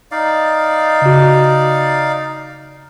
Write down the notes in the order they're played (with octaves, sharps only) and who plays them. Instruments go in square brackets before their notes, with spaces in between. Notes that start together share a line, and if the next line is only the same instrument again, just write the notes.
[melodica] D#4 D5 F5
[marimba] C#3 F#4